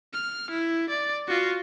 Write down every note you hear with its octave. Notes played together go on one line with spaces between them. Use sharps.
F6
E4
D5
F4 F#4